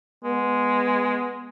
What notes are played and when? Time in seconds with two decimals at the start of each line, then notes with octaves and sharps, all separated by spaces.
0.24 G#3 B3